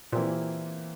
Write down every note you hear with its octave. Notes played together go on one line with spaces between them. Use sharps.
A#2 E3 A#3 E4 G4 C5